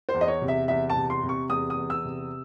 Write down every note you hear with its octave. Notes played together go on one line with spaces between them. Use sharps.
C5
E2
D#5
C#5
C3
E5
E2 E5
A5
C3
C6
C3
C#6
E2 D#6
D#6
E2
E6
C3